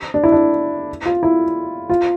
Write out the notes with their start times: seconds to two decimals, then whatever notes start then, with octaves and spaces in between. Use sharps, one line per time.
0.14 D4
0.24 E4
0.32 D4
1.05 F4
1.23 E4
1.90 F4